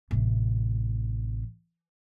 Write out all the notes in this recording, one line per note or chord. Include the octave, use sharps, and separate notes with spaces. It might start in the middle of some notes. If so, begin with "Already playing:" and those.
A1 C3